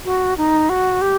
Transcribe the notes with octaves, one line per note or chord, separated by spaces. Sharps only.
F#4
D#4
F#4
G4